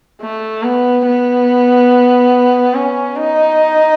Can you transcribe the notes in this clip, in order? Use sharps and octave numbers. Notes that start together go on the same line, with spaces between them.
A3
B3
B3
C#4
D#4